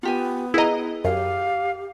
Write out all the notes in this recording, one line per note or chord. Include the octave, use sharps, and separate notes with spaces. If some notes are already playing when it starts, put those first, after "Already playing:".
B3 F4 G4 G#5
E4 G#4 B4 D#5 A#5
F#2 G4 F5